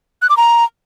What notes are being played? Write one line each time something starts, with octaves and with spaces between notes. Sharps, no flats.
F#6
D6
A#5